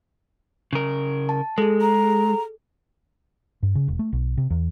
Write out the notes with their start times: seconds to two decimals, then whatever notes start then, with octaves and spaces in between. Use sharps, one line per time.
0.73 C#3 A#4
1.29 A5
1.58 G#3 G#4 A4
1.81 A#5
3.63 G2
3.75 C#3
3.88 E1
3.99 A3
4.13 B1
4.37 C3
4.50 E2